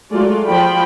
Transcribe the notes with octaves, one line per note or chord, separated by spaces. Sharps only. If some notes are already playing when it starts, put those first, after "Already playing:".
F#3 G#3 A3 F4 D5
F3 G5 B5